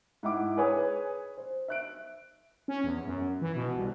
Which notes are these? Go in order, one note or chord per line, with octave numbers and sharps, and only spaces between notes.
G#2 E4 F#5 D6
G#4 B4 C#5 G#5 D#6
C5
E5 F#6 D7
C#4
E2
F#2
E3
B2
C2